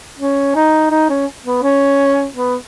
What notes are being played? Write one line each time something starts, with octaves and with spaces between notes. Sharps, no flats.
C#4
D#4
D#4
C#4
B3
C#4
B3